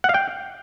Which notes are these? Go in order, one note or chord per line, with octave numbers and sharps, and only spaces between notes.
F#5
F5
G5